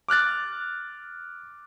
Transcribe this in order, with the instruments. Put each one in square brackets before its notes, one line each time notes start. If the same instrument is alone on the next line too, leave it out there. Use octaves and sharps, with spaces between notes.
[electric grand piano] D6 F6 F#6 A6